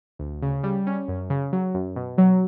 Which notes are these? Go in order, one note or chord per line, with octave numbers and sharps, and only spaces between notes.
D2
C#3
G3
C#4
F#2
C#3
F#3
F#2
B2
F#3